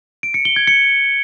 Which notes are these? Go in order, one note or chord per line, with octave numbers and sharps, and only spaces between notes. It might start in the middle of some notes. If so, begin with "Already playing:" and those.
D7
C#7
G7
G#6
C#7